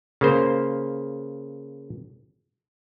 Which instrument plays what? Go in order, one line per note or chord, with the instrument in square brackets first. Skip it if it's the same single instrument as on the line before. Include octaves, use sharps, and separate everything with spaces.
[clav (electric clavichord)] C#3 A#3 C5